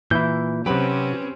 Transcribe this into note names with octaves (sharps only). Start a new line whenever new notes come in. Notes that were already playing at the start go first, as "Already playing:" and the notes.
A#2 E3 E4 G6
C3 F#3 C4 C#4 G4 B4